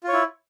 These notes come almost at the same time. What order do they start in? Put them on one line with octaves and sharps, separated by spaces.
F4 C#5 E4